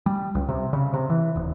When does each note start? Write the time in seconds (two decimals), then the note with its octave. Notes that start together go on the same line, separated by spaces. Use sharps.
0.06 G3
0.35 C#2
0.49 C3
0.73 C#3
0.94 C3
1.10 E3
1.36 D#1